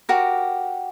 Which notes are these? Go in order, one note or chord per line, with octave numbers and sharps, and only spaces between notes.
F#4 G4 A#4